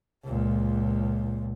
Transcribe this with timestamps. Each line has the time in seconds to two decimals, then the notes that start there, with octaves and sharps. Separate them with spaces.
0.24 C#2 A#2